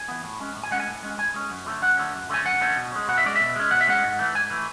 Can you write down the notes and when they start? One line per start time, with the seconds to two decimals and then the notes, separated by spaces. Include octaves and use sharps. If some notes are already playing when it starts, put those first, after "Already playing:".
Already playing: G#5
0.08 E3 B3
0.24 A2
0.40 G#3 C#4
0.55 A2
0.63 G#5
0.71 G#3 C#4 F#5
0.80 G#5
0.87 A2
1.03 G#3 C#4
1.18 A2 G#5
1.34 G#3 C#4
1.51 F#2
1.66 D3 A3 C#4
1.82 F#2 F#5
1.97 D3 A3 C#4
2.13 F#2
2.29 D3 A3 C#4 G#5
2.45 F#2 F#5
2.61 D3 A3 C#4
2.77 B2
2.92 G#3 C#4
3.08 B2 F#5
3.18 E5
3.24 G#3 C#4 D5
3.36 B2 E5
3.56 G#3 C#4
3.71 B2 F#5
3.81 E5
3.88 G#3 C#4 F#5
4.03 G#2
4.19 E3 A3
4.35 G#2 G#5
4.50 E3 A3